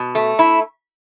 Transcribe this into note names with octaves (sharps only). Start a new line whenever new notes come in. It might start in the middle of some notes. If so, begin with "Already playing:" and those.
Already playing: B2
A3
E4